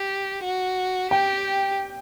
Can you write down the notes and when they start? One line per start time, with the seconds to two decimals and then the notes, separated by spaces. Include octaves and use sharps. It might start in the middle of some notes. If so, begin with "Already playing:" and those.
Already playing: G4
0.44 F#4
1.11 G4 G5